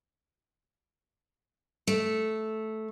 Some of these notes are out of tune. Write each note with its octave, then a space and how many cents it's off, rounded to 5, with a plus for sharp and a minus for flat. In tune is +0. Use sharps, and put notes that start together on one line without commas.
A3 -5